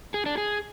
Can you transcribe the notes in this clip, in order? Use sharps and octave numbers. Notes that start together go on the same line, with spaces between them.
G#4
D4
G#4